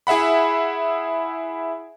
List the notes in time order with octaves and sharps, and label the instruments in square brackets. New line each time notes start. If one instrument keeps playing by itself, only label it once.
[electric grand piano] E4 G#4 E5 F#5 B5